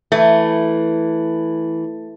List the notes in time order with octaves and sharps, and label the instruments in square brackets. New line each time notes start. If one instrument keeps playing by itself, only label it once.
[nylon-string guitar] E3 [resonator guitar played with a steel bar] A3